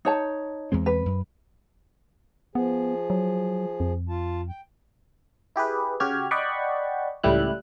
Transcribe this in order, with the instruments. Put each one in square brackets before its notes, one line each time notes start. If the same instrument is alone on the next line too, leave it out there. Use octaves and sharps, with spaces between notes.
[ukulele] D#4 C#5 A5
[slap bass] E2 G#3 C4
[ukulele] B4
[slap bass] F#2
[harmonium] F3 G#4 [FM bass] B3
[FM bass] F#3
F2
[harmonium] F4 A5
G5
[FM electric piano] E4 G4 G#4 B4
C#3 F#4 G4 F6 G#6
D5 D#5 F#5 G5 B5 C#6
C#2 A2 G3 E4 F#6